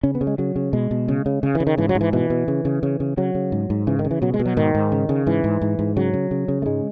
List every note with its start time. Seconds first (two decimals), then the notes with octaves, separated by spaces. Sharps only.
0.03 C#3 C#4
0.15 B3
0.21 C#3
0.27 G#3
0.38 C#3 F#3
0.56 C#3
0.73 B2 G#3
0.91 B2
1.08 C#3
1.26 C#3
1.43 C#3
1.55 E3
1.60 C#3
1.67 D#3
1.78 G#2 E3
1.89 F#3
1.95 G#2
2.01 E3
2.13 B2 E3
2.30 B2
2.48 C#3
2.65 C#3
2.83 C#3
3.00 C#3
3.17 C#3 F#3
3.35 C#3
3.52 G#2
3.70 G#2
3.87 C#3 E3
3.99 D#3
4.05 C#3
4.11 E3
4.22 B2 F#3
4.34 G#3
4.39 B2
4.46 F#3
4.57 G#2 D#3
4.75 G#2
4.92 C#3
5.09 C#3
5.27 G#2 E3
5.44 G#2
5.62 G#2
5.79 G#2
5.97 C#3 F#3
6.14 C#3
6.31 C#3
6.48 C#3
6.62 A3
6.66 G#2 G#3